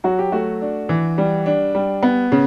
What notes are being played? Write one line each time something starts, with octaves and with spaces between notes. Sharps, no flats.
F#3 F#4
G4
A3 F#4
D4
E3
G3
D4
G3
B3
C#3